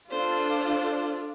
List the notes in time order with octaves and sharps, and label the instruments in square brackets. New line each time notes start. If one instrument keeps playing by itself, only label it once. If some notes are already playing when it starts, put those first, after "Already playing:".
[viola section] D4 F4 A4 [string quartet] C5